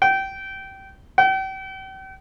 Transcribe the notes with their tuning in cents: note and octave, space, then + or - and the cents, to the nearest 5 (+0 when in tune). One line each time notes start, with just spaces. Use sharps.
G5 -20
G5 -40